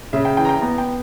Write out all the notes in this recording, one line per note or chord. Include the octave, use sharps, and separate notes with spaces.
C#3 E5
G5
E3 G5
A#5
G5
B3 A#5
G5